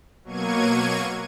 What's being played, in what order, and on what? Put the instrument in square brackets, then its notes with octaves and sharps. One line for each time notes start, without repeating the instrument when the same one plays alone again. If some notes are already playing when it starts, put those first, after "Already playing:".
[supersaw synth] B2 F#3 A#3 C#6 G#6 D#7